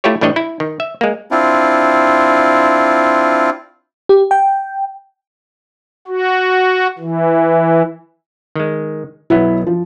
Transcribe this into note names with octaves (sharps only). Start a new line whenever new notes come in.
A3 E4 F4 G4 C#5
A2 E3 G3 D4 C#5 D#5
E4
D#3
E5
G#3 A#3
C4 D4 E4 F4
G4
G5
F#4
E3
D#3 G#3
B1 F#3 B3 E4
F3